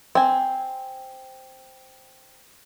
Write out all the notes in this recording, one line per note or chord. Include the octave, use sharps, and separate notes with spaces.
C4 G#5